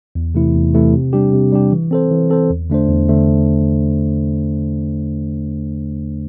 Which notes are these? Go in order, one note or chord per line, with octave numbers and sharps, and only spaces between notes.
E2
C3 E3 A3 E4
E2
C3 E3 A3 E4
C3
G3 D4 G4
C3
G3 D4 G4
E3
C4 A4 C5
E3
C4 A4 C5
E2
D3 A3 D4 C5
E2
D3 A3 D4 C5